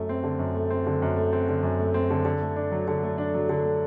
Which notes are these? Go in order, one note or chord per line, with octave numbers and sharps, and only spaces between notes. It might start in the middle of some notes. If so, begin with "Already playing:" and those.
Already playing: F#2 A3
C4
D3
F#2
A3
C4
D3
F#2
A3
C4
D3
F#2
A3
C4
D3
D3
A3
D4
F#3
D3
A3
D4
F#3
D3
A3